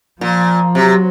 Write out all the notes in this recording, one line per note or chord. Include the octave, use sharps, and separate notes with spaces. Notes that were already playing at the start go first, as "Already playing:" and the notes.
A#2 F3
C3 F#3